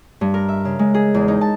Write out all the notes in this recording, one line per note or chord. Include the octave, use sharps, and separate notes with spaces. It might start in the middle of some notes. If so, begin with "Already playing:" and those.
G2
A#4
E5
C#3
G#3
G#4
E2
D#4
A5